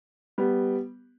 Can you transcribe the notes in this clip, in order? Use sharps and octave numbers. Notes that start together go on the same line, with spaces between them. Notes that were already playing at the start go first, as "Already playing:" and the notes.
G3 B3